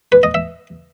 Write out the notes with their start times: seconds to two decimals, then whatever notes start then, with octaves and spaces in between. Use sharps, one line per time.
0.12 B4
0.23 D#5
0.34 E5